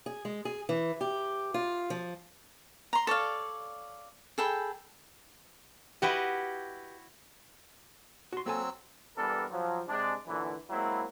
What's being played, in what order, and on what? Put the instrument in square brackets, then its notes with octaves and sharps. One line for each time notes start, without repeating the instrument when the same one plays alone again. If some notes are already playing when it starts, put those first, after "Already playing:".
[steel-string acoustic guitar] G#4
G#3
G#4
E3
G4
F4
F3
[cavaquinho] A#5 C6
A4 C#5 D5 F5
G#4 A4 G5 B5
[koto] E4 F#4 D#5 [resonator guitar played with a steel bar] G4 B4
[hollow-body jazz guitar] F#4 C6
[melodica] F#3 C4 E6 [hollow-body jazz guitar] A#3 A4 G#5
[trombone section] E3 G3 B3 D4 A4 A#4
F3 F#3
C3 G#3 D4
F#2 A#2 D3 E3
F#3 G#3 A#3 C4 E4